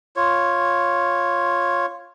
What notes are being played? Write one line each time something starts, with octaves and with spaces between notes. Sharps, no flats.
F4 C#5